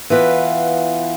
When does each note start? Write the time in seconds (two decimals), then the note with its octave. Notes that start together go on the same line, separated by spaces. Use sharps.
0.10 E3 B3 F4 B4